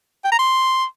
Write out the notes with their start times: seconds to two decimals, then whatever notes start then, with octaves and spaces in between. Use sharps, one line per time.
0.24 G5
0.32 A#5
0.39 C6